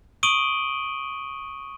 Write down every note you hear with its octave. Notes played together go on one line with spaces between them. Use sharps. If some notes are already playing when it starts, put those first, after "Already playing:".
C#6 D#6 D7 D#7 F#7 G7